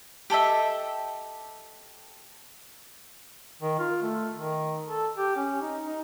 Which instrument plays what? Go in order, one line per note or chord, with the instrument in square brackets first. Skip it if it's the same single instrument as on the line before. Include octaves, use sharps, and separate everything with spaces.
[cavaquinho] G4 A4 D#5 E5
[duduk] D#3
F4
A3
D#3
A4
G4
C#4
D#4
D#4